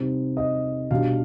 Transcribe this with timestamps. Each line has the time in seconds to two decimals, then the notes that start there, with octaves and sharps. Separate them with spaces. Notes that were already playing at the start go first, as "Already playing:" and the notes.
Already playing: C3 G3 C4 D#4
0.37 D#5
0.91 B2 G3 D4 F5